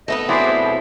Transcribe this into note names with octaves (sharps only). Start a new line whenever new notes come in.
A3 B3 B4 D#5
F#3 C4 E4 G#4 C5 D5
B2